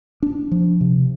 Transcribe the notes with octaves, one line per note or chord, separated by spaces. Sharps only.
D4
F3
C3